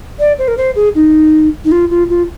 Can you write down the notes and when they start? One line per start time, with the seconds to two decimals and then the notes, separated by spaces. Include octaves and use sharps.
0.20 D5
0.39 C5
0.48 A#4
0.58 C5
0.76 G#4
0.95 D#4
1.65 D#4
1.72 F4
1.90 F4
2.09 F4